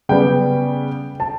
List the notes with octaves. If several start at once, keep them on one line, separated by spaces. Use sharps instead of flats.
C#3 G3 B3 G5
A5